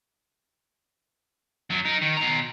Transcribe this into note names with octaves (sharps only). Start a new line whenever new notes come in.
F#2 F#3
D#4 A#4
D#3
B2 A#5